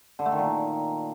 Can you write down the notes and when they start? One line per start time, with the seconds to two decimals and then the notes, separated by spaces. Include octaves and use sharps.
0.19 D3
0.26 A3
0.32 D#3
0.39 A#2